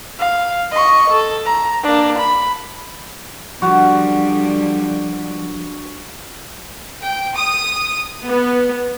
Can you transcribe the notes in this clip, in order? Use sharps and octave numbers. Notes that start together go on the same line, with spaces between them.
F5
D#5 C#6
A4
A#5
A#3 D4
B5
D3 F3 G3 F#4
G5
D#6
B3